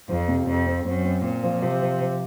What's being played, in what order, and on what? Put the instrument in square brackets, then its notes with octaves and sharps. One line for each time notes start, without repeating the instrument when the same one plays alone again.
[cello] F2 [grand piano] F3
[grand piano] C3
[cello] F2 [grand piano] C4
[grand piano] C4
[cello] F#2 [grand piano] C4
[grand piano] C4
[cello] A#2 [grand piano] C4
[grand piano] F3
[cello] C3 [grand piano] F3
[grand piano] F3
F3